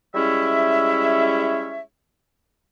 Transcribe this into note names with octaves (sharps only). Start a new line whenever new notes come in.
G3 G#3 C#4 E4 C#5 E5